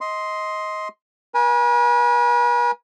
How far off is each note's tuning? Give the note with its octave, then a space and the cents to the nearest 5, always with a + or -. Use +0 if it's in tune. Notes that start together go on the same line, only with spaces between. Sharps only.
D#5 +20 C6 +0
B4 -45 G#5 +0